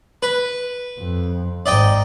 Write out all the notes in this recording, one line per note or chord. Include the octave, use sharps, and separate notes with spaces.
B4
F2
G#1 G#2 D5 D#5 G5